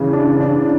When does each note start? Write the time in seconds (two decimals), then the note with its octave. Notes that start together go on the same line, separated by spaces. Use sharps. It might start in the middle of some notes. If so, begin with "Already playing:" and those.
Already playing: C#3 E3
0.13 D4
0.40 D4